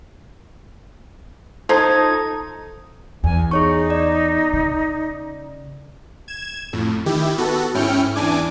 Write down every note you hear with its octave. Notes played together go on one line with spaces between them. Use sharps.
F3 D#4 A4 A5 A#5 G#6
E2 G#5
D#4 G#4 C#5 C#6
D5
C#3
G#6 E7
F2 A2
D#3 E4 G4
B3 F#4 A4
G#2 C#4 E4 G5 F6 C#7
E2 E3 D4 G#5 D6